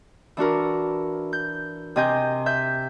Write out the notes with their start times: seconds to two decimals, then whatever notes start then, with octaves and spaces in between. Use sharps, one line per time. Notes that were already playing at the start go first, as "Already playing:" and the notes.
0.37 E3 D4 F#4 A#4
1.33 G6
1.96 C3 C4 D#5 G#5 G6
2.46 E5 G6